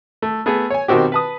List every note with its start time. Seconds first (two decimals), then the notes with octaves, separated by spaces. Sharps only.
0.22 A3
0.46 A3 B3 G#4
0.70 C#5 G#5
0.88 B2 D#3 C4 F#4 G4
1.12 B4 A5 D#6